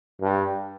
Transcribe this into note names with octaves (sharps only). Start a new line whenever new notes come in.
G2